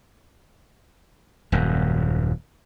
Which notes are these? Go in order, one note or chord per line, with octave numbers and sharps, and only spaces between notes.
D#1 F#2